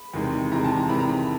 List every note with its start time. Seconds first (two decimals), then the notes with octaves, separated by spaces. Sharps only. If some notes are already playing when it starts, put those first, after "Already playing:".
Already playing: B5
0.14 E2 C3 D#3 G#3
0.52 E2 C3 D#3 G#3 A#5
0.64 A5
0.77 A#5
0.90 E2 C3 D#3 G#3 B5
0.99 A#5
1.09 B5